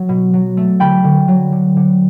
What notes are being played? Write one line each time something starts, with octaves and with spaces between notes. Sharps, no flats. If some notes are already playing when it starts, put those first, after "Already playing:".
Already playing: F#3
B2
F#3
A3
D3 G5 B5
D3
F#3
D3
D3